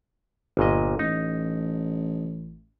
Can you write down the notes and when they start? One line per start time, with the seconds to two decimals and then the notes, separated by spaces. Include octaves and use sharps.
0.57 G1 A#2 D#5
0.99 A1 D#4